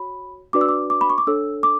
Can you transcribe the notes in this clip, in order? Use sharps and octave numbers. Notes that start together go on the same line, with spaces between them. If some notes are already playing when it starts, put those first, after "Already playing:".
Already playing: F#4 C#5 B5
D4 F#4 B4 D5 D6
E6
D6
D6
B5
C#6
D6
D4 A4 C#5 E6
D6